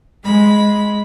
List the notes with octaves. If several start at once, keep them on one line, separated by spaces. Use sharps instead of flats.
G#3 B5